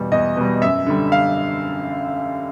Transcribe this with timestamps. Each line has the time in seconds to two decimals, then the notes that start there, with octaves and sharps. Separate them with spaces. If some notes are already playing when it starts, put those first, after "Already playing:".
Already playing: E2 B2 G3
0.12 E2 D#5
0.37 B2 G3
0.61 F#2 E5
0.86 D3 G3
1.12 F5